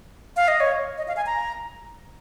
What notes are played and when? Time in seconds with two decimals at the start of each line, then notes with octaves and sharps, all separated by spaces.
0.36 F5
0.48 D#5
0.60 C#5
0.98 D#5
1.08 F5
1.17 G#5
1.26 A#5